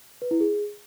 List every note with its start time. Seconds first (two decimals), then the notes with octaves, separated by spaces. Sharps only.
0.22 B4
0.31 E4
0.40 G#4